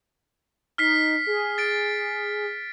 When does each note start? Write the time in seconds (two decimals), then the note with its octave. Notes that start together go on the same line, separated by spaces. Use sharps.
0.78 D#4 F6 B6 C7
1.27 G#4
1.58 A6 D7